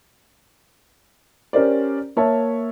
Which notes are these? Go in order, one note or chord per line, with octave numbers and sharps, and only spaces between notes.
C#4 G4 A#4 C5 D5
A#3 C#5 E5 A5